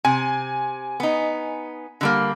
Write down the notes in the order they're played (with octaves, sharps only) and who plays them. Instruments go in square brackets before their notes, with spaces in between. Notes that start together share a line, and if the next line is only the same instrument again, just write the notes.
[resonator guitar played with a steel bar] C3 [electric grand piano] G#5
[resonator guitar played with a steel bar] B3 D#4
D3 G3 A#3